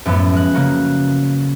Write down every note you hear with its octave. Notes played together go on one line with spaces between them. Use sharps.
F#2 A2 F3 A3 B3
G#3 F#6
C#3 A#3 F#4